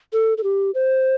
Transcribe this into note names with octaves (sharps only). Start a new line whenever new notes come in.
A4
A4
G4
C5